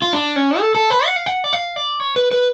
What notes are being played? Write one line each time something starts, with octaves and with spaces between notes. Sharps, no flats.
F4
D4
C#4
A4
A4
B4
F#5
F5
F#5
D5
F5
D5
C#5
B4
B4